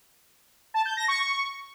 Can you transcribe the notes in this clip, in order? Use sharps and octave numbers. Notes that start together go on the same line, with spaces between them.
A5
G6
A#6
C#6